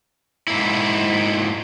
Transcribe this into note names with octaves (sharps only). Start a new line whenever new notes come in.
G#2 A#3 E4